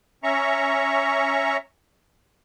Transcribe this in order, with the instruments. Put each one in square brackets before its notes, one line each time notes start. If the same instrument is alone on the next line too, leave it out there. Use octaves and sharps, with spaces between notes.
[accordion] C#4 E5 A#5 C#6